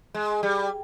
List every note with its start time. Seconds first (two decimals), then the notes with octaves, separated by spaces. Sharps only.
0.14 G#3
0.43 G3